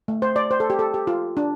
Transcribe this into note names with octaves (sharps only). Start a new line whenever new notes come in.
A3
C5
D5
C5
A4
G4
A4
G4
F4
D4